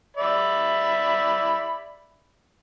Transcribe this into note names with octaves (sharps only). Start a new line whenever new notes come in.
D5 E5 B5